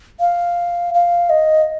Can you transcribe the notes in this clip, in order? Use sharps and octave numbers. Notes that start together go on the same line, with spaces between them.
F5
F5
D#5